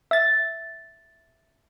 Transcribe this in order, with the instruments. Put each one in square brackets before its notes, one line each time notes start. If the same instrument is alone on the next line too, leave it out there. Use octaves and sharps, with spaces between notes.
[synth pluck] E5 A6